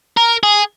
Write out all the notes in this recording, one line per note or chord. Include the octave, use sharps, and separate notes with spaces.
A#4
G#4